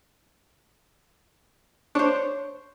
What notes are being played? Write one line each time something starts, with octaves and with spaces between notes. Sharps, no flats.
D4 C5 C#5